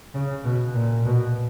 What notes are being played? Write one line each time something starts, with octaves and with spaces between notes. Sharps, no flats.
C#3
B2
A#2
B2